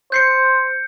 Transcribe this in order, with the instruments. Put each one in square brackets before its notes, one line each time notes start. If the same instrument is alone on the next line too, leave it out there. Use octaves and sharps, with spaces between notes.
[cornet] C5 [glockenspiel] G6 C7 C#7